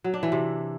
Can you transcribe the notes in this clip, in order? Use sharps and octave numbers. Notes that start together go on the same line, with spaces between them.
F#3
D4
E3
C3